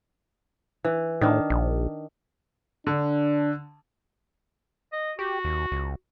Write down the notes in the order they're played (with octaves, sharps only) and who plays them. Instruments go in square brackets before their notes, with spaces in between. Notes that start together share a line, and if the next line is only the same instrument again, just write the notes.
[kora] E3
[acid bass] A2 [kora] D#3 D4
[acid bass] A#1
[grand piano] D3 [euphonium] D4
[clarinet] D#5
[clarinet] F#4 [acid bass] G4
[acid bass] D#2
C#2